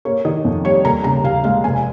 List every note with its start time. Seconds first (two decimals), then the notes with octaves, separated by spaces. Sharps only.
0.05 A#3 C#5
0.25 D#3 D#5
0.45 F2
0.65 G3 C#5
0.85 D#2 A#5
1.04 C#3 A#5
1.24 D#2 F5
1.44 G#3 F5
1.64 F1 G#5